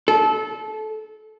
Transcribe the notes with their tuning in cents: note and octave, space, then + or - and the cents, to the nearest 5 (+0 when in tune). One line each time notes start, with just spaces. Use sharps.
A4 -25